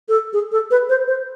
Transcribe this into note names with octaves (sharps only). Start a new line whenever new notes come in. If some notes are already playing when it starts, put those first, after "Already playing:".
A4
G#4
A4
B4
C5
C5